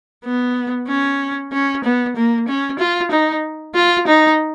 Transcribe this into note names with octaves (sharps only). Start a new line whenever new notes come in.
B3
C#4
C#4
B3
A#3
C#4
F4
D#4
F4
D#4